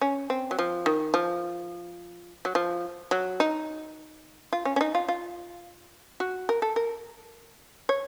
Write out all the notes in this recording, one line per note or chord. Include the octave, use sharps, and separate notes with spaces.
C#4
C4
F#3
F3
D#3
F3
F#3
F3
F#3
D#4
F4
C#4
C#4
D#4
F4
F4
F#4
A#4
A4
A#4
C#5